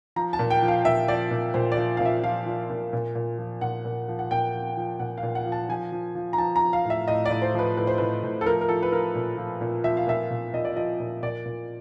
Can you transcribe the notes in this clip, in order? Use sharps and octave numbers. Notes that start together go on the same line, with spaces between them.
F3 A#5
A5
A#2
G5
F3
F5
A#2 E5
F3 D5
A#2
A#2 C5
D5
F3
A#2 F5
E5
F3 F5
F3
A#2
A#2
A#2
F3
A#2 F#5
A#2
F3
F#5
A#2 G5
F3
F3
A#2 F#5
F5
A#2
F#5
F3
A5
F3 G#5
F3
F3
A#5
F3 A5
A#5
F3
F5
A2 E5
A2 D#5
D5
A2
C5
F3 B4
A2 B4
C5
A2 B4
A2
A4
F3 A#4
A#4
F3 A4
B4
F3 A#4
A#2
F3
A#2
F3 E5
F5
A#2 E5
A#2
A#2 D#5
D5
F3 D#5
A#2
A#2 D5
A#2